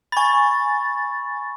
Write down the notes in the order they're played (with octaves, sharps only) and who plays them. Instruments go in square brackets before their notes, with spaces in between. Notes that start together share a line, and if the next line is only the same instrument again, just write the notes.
[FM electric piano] G#5 A6 [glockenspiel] B5 C#6